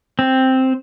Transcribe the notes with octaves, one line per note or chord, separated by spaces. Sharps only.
C4